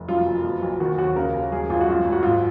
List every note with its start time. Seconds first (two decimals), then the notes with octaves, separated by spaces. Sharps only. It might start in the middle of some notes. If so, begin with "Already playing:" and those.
Already playing: F1
0.09 F#2 F4
0.26 F#1
0.44 B2
0.62 B1
0.80 D#3 F#4
0.98 D#2 F#4
1.16 C#3 A#4
1.34 D#2
1.51 F#2 G#4
1.70 G#1 F4
1.81 F#4
1.88 F#2 F4
2.05 G#1
2.12 F#4
2.23 G#2 F4